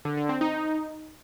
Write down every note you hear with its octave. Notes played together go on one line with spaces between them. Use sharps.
D3
D3
C4
D#4